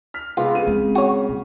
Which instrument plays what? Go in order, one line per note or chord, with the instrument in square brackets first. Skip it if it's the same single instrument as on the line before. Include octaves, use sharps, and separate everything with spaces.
[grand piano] F6 B6
[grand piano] C3 G#3 B3 [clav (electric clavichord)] F4
[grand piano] C#3 D#7
[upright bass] G#3 C4
[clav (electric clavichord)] F#4 C#5
[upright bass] A#2